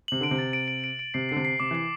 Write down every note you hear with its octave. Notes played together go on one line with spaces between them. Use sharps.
C3 F#7
D3 D7
C3
A6
D7
D7
D7
D7
C3 C7
D3 C7
C3
C7
C3 D6
E3 C7